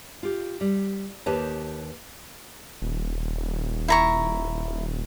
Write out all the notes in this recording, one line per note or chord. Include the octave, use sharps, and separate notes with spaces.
F4 G4
G3
D#2 G4 B4 C#5 A5
D#1
E4 A#5 C#6